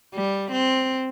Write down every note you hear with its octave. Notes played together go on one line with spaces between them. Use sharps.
G3
C4